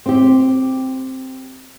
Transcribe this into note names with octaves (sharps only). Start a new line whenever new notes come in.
C4 G4